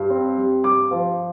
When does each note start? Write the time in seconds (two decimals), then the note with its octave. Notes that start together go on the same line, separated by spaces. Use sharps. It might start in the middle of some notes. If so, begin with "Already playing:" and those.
Already playing: G2
0.10 C4
0.37 G3
0.64 G2 D6
0.91 F3